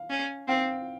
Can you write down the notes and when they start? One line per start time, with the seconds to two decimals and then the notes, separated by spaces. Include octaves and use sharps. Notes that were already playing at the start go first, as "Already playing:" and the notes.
Already playing: F5
0.10 C#4
0.48 C4 F5 G5